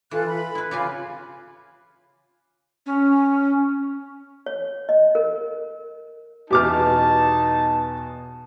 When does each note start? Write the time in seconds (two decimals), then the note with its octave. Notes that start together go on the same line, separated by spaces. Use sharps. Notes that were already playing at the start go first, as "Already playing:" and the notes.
0.11 E3 F4 A4 F#6
0.27 B5
0.55 E4 B4
0.71 C#3 F4 G4 G#5
2.85 C#4
4.46 C#5
4.89 D#5
5.15 A#4
6.51 E2 B2 D#4 G4 A5 D6 F6